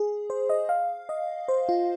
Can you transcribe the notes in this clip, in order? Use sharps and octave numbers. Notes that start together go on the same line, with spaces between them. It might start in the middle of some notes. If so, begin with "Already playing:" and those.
Already playing: G#4
C5
D#5
F5
D#5
C5
F4